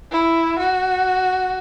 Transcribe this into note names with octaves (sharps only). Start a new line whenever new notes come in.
E4
F#4